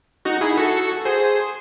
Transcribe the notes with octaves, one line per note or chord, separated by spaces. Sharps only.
D#4 F#4
E4 G#4
F#4 A4
G#4 C5